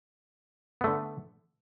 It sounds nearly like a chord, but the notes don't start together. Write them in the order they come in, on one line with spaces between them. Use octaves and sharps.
B3 A3 D3